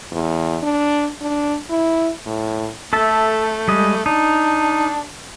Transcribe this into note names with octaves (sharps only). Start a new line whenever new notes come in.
E2
D4
D4
E4
A2
A3 A4 E5 A5
G3 G#3 D#5
D4 D#4